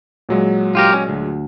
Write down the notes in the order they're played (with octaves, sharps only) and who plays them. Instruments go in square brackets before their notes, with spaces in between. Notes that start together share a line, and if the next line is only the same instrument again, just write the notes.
[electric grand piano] A#2 F#3 G#3
[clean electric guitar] F4 G4 A#4
C#4
D2